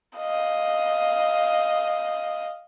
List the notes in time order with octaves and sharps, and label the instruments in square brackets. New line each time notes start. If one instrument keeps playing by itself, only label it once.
[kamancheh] D#5 F5